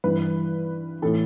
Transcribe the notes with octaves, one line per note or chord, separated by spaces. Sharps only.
G2 E3 B4
A2 E3 A4